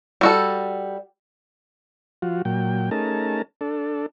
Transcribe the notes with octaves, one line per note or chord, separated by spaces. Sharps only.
G3 F#4 A4
F3 F4 F#4
A#2 F#3 G5
A3 C#4 D#4 G#4 A#4 A5
D4 A4